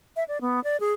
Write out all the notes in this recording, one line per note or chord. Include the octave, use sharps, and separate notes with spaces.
E5
D5
B3
D5
G#4